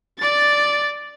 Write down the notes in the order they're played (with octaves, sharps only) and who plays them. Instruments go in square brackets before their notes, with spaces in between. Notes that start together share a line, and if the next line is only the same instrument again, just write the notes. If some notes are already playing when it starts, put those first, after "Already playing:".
[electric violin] D5 A6